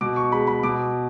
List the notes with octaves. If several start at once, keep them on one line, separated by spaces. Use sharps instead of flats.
B2 D6
C#6
G#3 B5
B5
B2 D6